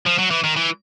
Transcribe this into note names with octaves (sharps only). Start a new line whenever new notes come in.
F3
F#3
E3
D#3
E3